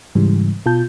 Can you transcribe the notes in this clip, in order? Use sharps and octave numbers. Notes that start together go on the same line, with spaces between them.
G#2 C#3 E3 G3
B2 F4 A5 G6